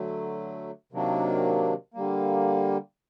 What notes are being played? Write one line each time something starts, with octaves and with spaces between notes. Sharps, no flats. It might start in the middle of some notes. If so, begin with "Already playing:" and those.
Already playing: D3 F#3 A3
C3 D#3 F#3 A#3 D4
D3 G3 A#3